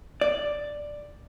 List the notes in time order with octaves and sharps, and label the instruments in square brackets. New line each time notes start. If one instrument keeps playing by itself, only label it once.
[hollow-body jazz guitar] D5